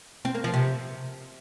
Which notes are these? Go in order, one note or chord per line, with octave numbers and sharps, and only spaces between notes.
C4
A#3
F3
C3